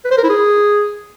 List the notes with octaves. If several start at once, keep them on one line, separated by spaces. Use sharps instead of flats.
B4
C5
A#4
E4
G#4